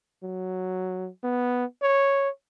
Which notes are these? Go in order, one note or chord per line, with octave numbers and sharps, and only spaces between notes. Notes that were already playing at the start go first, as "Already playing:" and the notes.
F#3
B3
C#5